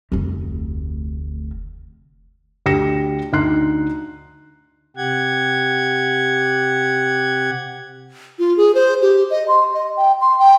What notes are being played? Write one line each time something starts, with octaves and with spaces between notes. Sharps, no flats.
F1 D2
D2 G4 G5 A#6 C#7 E7
D2 D#4 C6 F#6 C7
C3 G4 F#5 G#6
F4
G#4
C5
G4
D#5
C6
D#5
G5
C6
G5